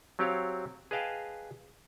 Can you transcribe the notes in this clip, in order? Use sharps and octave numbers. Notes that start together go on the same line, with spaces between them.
F#3 C4 G4 C#5 F5
G#4 B4 D#5 F5 G5 A5